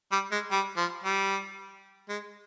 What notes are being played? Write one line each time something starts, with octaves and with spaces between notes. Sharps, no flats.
G3
G#3
G3
F3
G3
G#3